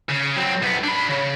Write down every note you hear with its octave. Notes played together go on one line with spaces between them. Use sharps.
C#3
F#3 C4
C2 B3
D4 B5
C#3